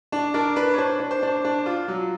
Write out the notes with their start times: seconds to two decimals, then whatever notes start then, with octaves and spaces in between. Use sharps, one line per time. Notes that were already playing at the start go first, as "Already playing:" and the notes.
0.12 D4
0.34 D4 A#4
0.56 D4 B4
0.74 C#5
0.78 D4 C5
1.00 D4
1.11 C5
1.23 D4 C5
1.45 D4
1.66 F4
1.88 F#3